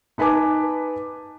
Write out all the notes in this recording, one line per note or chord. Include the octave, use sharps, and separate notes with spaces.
D#4 B4 G#5 A5 D6